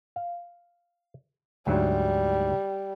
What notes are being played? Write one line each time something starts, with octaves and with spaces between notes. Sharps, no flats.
F5
D2 G#2 F#3 G3